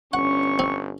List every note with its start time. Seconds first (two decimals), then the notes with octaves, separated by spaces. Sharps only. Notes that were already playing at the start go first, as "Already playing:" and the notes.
0.13 G1 C#4 F#5 C#6
0.59 C4